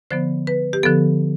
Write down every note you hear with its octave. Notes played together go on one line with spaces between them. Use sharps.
D3 F3 B3 C5
B4
G4
D3 F3 B3 A4